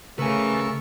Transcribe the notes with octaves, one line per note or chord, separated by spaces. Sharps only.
C#3 A3 A#4 B4 G#5 C#6 E6